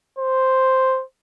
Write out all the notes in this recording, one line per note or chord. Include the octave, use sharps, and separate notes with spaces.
C5